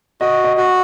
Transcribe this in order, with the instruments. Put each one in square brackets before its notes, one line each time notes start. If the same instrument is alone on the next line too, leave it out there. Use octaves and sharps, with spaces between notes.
[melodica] F#4 [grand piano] D#5
[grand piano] D#5
[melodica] F#4